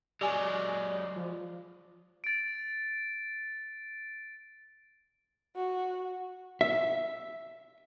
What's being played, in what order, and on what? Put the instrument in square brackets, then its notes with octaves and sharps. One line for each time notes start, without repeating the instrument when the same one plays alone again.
[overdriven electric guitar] F#3 G#3 [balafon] G4 G#5 [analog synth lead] D5
[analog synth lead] F3
[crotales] A6 D7
[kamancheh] F#4
[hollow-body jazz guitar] E5